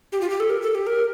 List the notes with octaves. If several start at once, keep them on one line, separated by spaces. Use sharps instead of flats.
G4
F4
G4
A4
A#4
A4
G4
A#4